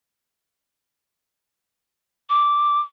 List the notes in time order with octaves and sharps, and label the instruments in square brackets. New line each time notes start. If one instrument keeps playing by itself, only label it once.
[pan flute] D6